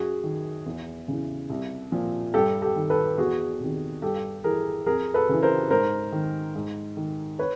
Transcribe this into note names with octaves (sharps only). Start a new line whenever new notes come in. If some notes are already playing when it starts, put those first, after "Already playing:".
Already playing: F#2 F#4 G#4
D#3
E2
C#3 E3
C2
A#2 F3
G2 G4 A4
G4 A4
D#3
A4 B4
E2 F#4 G#4
C3 D#3
G2 G4 A4
E3 G#4 A#4
F2 G#4 A#4
A4 B4
C#3 E3
A#4 C5
G#2 A#4 C5
D#3
G#2
D#3
B4 C#5